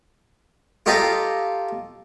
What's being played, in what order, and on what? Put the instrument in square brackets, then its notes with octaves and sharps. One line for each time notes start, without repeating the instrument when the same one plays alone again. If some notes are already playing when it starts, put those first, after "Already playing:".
[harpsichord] F4 G4 A4 D#5 F5 A#5